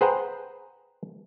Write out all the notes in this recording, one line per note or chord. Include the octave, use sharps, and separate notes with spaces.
G#4 B4 C5 F#5 G5 A#5